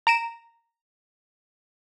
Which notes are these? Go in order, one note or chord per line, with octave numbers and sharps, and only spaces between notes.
A#5 D7 E7